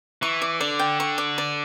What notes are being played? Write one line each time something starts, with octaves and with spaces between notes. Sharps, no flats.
E3 C#6
D5
D3 D5
G5
C#6
D5
D5